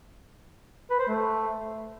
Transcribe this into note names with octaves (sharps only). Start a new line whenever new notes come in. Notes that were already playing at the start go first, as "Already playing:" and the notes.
B4
C5
A3